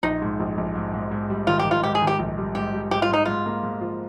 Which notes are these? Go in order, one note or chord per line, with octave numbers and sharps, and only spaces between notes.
A#1 D#4
G#2
A#1
A#1
G#2
G#2
G#2
G3
D#3 F4
G4
D#3
F4
G#2 G4
G#4
D#3
G4
A#1
G3
G#2 G4
G3
G#2 G4
F4
G#2 D#4
G#2 F4
A#3
G#2
F3